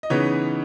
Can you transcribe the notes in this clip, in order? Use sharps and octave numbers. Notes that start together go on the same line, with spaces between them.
D#5
C#3 E3 B3 D#4 C#5